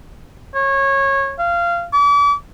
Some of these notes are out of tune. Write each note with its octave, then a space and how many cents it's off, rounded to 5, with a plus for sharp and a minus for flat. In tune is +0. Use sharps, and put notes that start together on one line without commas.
C#5 -20
F5 -20
D6 -40